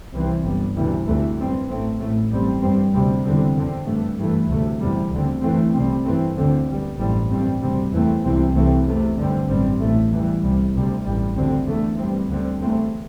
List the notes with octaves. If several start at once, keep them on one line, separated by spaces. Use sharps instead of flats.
C2 C3 E3 G3 C4
G1 G2 G3
D2 C3 E3 G3
D2 C3 E3 A3
G2 G3 C4
A1 A2 A3 C4
A1 A2 A3
A1 G2 G3 C4
G2 G3 C4
D2 C3 G3 C4
E2 D3 G3 C4
E2 D3 C4
G2 D3 A3
G2 E3 A3
D2 C3 A3
E2 C3 G3
D2 D3 C4
G2 E3 A3 C4
C2 C3 G3 C4
G2 E3 A3 C4
D2 D3 C4
G1 G2 G3
A1 G2 G3 C4
A1 G2 G3 C4
D2 C3 G3 C4
E2 E3 A3 C4
C2 C3 E3 C4
C2 C3 E3 A3 C4
E2 C3 A3
G2 D3 G3 C4
A1 G2 G3 C4
A1 A2 A3
E2 E3 G3
C2 C3 G3
D2 C3 G3
A1 G2 G3
D2 D3 G3 C4
E2 D3 A3
G2 G3 C4
D2 D3 G3 C4
E2 C3 A3 C4